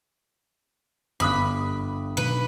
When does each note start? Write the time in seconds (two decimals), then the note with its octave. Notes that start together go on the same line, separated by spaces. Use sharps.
1.20 G1 G2 B5 D6 D#6 F#6
2.17 B1 B4